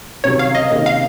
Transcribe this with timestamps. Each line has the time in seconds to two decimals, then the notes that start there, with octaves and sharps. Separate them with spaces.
0.24 C#2 C3 D#3 F#3 C#5
0.39 F5
0.55 D#5
0.70 C#2 C3 D#3 A#3
0.86 F5